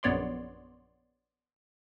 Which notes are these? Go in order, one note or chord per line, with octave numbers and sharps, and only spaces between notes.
A#1 F#2 B3 C#5 D5 C6